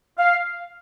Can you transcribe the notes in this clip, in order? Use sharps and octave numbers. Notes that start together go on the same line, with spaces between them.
F5